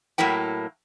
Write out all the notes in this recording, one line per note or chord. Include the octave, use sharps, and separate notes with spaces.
A2 F#3 A#3 E4 G5